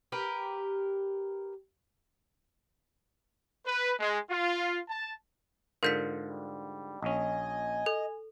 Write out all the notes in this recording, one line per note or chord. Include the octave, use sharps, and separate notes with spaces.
G4 A#4 B4
B4
G#3
F4
A5
G#2 D3 F4 A#4 G6 B6
G3
A#1 C#4 D#5 G#5
A4